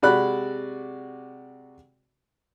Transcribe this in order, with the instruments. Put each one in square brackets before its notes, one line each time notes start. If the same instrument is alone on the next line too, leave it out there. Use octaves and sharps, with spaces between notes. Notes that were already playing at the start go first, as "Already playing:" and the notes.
[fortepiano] C3 G#3 F#4 D5 B5 F#6